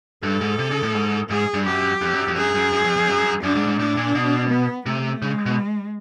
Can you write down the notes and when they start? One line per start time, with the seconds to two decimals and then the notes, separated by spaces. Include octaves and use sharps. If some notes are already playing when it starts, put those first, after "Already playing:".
0.23 G2 A4
0.41 G#2
0.59 C3
0.71 C#3
0.83 A2
0.94 G#2
1.30 G#2 G#4
1.54 G2
1.66 F#2 G4
2.01 F2
2.13 F#2
2.28 F2
2.37 F#2 G#4
2.55 F#2
2.72 F#2
2.84 F2
2.97 F2
3.08 F#2
3.43 F#2 D4
3.55 G#2
3.67 G#2
3.79 A2 D4
3.97 A#2
4.15 B2
4.50 B3
4.86 C3 A3
5.22 C#3 G#3
5.46 B2